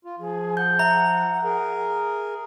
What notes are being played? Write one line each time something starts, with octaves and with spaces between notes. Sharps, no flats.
F4
F3 G#4
F#5 G6
E5 A#5
G#4 A#4